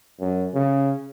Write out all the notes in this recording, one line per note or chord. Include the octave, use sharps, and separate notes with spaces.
F#2
C#3